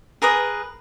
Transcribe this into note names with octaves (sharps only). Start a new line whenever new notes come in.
G#4 A#4 B4 D#6